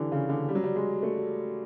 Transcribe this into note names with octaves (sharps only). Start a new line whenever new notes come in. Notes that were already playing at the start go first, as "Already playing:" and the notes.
Already playing: D3 E3 G3
C#3
D3
G3
F#3
G3
G#3
A3